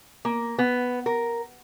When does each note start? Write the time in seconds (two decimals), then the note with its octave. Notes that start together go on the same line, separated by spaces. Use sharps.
0.25 A#3
0.59 B3
1.06 A#4